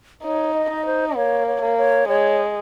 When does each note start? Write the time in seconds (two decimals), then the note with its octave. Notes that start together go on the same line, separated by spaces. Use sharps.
0.23 D#4 C#5
0.54 D#5
0.70 D#4
0.86 C5
1.08 D#5
1.16 A#3 C#5
1.47 C#5
1.62 A#3
1.78 C#5
2.08 G#3 C#5